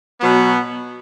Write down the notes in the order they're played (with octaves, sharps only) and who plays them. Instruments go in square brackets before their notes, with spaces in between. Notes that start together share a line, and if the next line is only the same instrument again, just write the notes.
[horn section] B2 F#3 B3